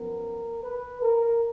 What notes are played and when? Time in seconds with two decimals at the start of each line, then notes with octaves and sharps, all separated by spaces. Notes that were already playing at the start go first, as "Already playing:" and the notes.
Already playing: F#2 F3 B3 A#4
0.63 B4
1.01 A#4